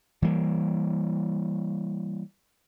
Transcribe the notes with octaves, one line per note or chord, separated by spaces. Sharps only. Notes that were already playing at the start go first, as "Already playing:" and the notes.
E3 G3 A#3